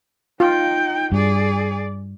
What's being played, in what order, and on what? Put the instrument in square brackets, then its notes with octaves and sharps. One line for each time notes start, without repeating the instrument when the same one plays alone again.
[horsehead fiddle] D#4 G5 [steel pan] F4
[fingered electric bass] G2 [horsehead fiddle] G#4 D5